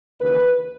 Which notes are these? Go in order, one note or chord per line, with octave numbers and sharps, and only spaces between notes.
D#2 C#3 E3 B4